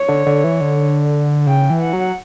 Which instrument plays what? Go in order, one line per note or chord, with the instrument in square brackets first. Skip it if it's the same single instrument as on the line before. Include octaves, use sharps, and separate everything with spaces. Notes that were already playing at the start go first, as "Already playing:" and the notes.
Already playing: [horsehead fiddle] C#5
[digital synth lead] D3
D3
E3
D3
[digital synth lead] C#3 [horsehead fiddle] G5
[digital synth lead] E3
[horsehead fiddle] F#5
[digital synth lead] F#3